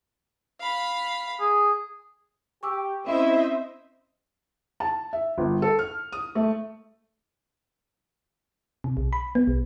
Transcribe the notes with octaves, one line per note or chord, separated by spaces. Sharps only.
F5 B5
G#4
G4 C#6 D6 E6
C4 C#4 E4 C5 D#5 E5
A5
E5
G1
A4
F6
D#6
A3
C3
B1
B5
B3
B1